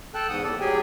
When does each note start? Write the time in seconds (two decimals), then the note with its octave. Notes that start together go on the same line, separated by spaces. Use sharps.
0.14 A4 G5 A5 F#6
0.29 E2 G#2 F#5 D#6
0.44 D#2 A2 A4 D5
0.61 A2 F#3 G4 G#4 G5 G#5